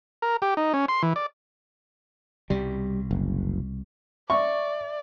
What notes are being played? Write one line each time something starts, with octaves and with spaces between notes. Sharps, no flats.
A#4
G4
D#4
C#4
C6
E3
D5
C2 B2 G3
F#1
D5 E5 C#6